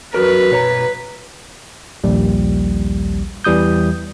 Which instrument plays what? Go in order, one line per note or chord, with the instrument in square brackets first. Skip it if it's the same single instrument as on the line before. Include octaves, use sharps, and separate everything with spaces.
[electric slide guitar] F#3 F#4 A#4 [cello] B4
[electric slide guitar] B2 C#5 A#5
[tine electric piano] A#1 D#2 G3
E2 E3 G3 D#6 G6